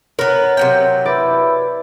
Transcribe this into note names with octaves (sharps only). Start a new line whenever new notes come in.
B3 A#4 B4 C#5
C3 F#3 G5
E4 B4 D5